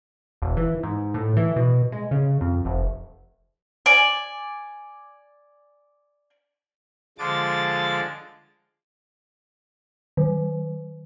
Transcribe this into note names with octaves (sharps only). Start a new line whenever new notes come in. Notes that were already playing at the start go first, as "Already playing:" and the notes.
E1
E3
G#2
A2
E3
B2
G#3
C#3
F2
F1
D5 G#5
D3 F3 G#3 D6 A6
D#3